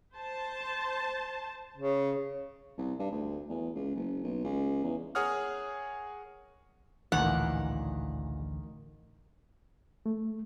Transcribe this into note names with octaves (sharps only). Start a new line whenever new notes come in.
C5 A5
C#3
C2
G2
D2
E2
C#2
F#1
B1
C#2
E2
G#4 A#4 C#5 F#5 D#6 F6
A1 D2 A#2 D#3 E3 F#5
A3